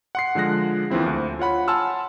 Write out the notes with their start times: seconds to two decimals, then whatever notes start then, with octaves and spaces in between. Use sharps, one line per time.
0.15 F#5 C6 C7
0.35 D3 F3 G#3 F#6 A#6
0.90 D#2 E3 F3 C4 E4
1.06 D2
1.39 F4 C#5 F#5 B5
1.68 F#5 G#5 A5 C6 E6 F6